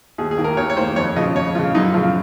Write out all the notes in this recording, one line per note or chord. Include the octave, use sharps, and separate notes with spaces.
D#2 G#4
G#4
D#3 A#3
A#4
D#2 C#5
C#5
D#3 A#3 C5
F2 C#5
C#3 F3 D#5
F2 C#5
C#3 F3 F4
F#2 D#4
C#3 F3 F4